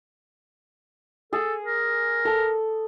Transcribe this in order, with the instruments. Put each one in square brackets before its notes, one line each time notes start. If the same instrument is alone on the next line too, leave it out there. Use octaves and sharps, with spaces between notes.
[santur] G#4 [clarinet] A4
[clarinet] A#4
[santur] A4